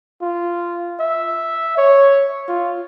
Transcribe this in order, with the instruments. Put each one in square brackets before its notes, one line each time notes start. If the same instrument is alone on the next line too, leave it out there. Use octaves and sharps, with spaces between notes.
[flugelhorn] F4
E5
C#5
F4